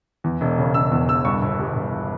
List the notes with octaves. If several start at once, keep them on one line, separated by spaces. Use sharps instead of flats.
E2
E1
C#3
E1 E6
E2
E1 E6
G2 C#6
G1
G3
G1